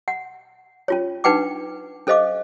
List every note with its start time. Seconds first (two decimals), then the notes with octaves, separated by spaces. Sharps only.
0.08 F#5
0.88 C#4 F4 C#5
1.24 D4 D#4 B4 F#5 G5 D6
2.07 C#4 A4 C5 D#5 F5 D6